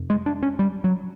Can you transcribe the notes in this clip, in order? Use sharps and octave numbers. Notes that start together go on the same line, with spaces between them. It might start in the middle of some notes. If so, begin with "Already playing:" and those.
Already playing: F2 C3
G#3
D4
C#4
G3
F#3